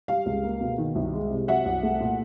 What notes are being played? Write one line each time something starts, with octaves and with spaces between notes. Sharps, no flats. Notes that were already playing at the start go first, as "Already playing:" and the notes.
G3 F5
C#2
A#3
B2
D#3
C2
G#3
C3
F#3 E5 F#5
C2
A3
A#2